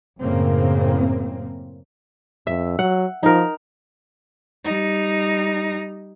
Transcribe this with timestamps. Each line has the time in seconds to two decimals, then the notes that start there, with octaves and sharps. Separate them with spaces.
0.22 F#2 A2 C#3 A#3 C4
2.47 F2 E5
2.79 F#3 F#5
3.23 F3 D#4 A#4
4.64 G3 D#4